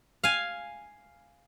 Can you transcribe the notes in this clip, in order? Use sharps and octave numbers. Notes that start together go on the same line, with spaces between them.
F5 G#5